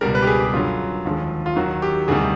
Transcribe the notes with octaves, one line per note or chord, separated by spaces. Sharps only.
C#2 B2 G3 A#4
B4
G4
G#4
G4
F#2 D3 F#3 F4
D#2 D3 F3 G#3
F4
D#2 D#3 F#3 F#4
G4
D2 C3 D#3 G3 G#4